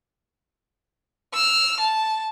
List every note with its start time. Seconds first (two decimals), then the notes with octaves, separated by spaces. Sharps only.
1.33 E6 F6
1.80 A5